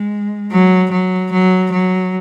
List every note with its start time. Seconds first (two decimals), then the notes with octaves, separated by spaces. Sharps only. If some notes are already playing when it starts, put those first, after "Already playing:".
Already playing: G#3
0.51 F#3
0.91 F#3
1.32 F#3
1.71 F#3